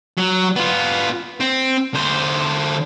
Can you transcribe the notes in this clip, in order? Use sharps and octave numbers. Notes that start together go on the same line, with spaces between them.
F#3
B3 F4
C4
D3 C5